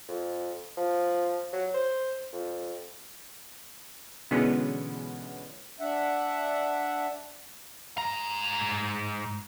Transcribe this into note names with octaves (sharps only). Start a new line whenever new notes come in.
F2
F3
F#3
C5
F2
B2 D3 E3 G#3 B3 C#4
D4 E5 F#5
G#2 A#5